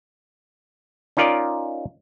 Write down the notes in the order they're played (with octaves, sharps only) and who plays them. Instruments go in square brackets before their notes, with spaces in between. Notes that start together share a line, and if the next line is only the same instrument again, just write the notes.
[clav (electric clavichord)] C#4 D#4 F4 A#4 D5 D#5